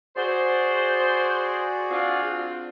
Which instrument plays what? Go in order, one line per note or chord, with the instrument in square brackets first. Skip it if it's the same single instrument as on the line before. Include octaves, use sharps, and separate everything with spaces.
[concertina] F#4 G#4 D5 [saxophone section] C5
[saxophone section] C4 D4 F4